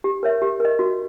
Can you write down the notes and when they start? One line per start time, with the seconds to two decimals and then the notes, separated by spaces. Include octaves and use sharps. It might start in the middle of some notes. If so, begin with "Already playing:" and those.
0.04 G4
0.23 A#4 C#5 E5
0.42 G4
0.60 A#4 D#5
0.79 F#4